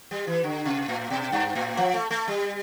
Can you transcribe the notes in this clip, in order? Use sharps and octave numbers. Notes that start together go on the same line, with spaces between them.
G3
E3
D3
C3
A2
B2
G2
A2
F3
A3
A3
G3